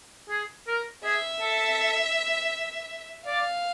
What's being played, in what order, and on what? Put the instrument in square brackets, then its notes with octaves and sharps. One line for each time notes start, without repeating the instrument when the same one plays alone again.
[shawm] G#4
A#4
[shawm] G#4 [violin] E5
[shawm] A4
[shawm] D5 [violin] F5